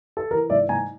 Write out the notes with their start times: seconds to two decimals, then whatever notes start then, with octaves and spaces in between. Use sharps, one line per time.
0.17 A4
0.31 E3 A#4
0.50 G#2 D5 E5
0.69 G#2 G#5 A#5